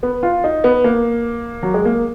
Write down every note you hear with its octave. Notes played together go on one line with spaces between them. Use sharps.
B3
F4
D#4
B3
A#3
F#3
G#3
A#3